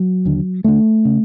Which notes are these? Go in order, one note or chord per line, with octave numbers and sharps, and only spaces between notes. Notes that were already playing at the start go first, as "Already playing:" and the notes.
Already playing: F#3
D#2 D3
D2 D3 A3
C#3